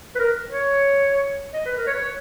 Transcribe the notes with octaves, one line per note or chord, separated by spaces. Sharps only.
B4
A#4
C#5
D#5
B4
A#4
C#5
B4
C#5